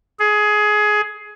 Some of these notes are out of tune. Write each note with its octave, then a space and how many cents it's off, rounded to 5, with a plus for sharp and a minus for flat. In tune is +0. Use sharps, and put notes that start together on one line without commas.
G#4 +20